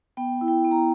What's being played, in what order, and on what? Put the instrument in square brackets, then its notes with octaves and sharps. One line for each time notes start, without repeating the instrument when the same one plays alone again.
[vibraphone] B3 G5
E4
G5
B3
A#5